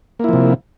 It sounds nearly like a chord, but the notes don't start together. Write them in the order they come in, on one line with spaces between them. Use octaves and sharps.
A#3 E4 F3 C3